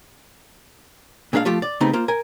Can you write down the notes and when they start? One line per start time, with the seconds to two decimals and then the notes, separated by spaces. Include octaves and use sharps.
1.33 A#2 G#3 D4 B4 F5
1.45 F3 A3 F4 G4
1.62 D5
1.80 C#3 A3 B3 C4 D#4 G4
1.93 A#3 F4 C5
2.08 A#4 G#5